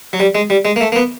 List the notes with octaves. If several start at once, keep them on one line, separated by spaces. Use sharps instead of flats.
F#3
G3
G#3
G3
G#3
A#3
A3
A#3
B3